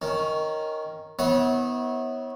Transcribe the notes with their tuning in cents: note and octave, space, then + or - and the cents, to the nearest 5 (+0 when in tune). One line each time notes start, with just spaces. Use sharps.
D#3 +0 C#4 +0
B3 +0 E4 -40 C#5 -25